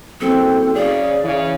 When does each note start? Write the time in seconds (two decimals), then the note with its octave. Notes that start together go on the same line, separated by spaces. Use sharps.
0.21 F#1 C4 A4
0.75 C#3 G#4 D5
1.23 C#3 E3